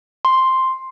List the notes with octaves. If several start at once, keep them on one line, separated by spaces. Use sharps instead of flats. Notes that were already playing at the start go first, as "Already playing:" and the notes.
C6